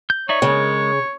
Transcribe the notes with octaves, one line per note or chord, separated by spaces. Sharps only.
G6
D#4 C#5 D5 E5
C#3 G#3 A#4